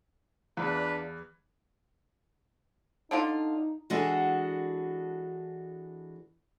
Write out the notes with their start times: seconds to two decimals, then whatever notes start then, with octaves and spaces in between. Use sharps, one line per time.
0.57 E2 D4 F4 B4
3.11 D3 D4 D#4 F4
3.90 E3 G#3 D4 F#4 A4